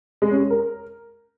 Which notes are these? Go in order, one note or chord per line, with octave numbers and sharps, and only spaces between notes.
G#3
C#4
G#3
A#4